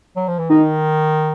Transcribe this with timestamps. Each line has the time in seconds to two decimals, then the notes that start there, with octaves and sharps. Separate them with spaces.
0.16 F#3
0.28 F3
0.39 E3
0.50 D#3 D#4